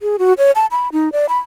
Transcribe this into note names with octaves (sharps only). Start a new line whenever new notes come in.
G#4
F#4
C#5
A5
B5
D#4
D5
B5